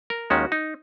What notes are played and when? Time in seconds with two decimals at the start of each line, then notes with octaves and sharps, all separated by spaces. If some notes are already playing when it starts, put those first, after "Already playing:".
0.10 A#4
0.30 D#2 D#3 G#3 C#4 F#4
0.52 D#4